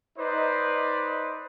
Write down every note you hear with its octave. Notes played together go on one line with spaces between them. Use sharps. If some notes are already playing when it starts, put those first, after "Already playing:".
D#4 B4 C5 D5 D#5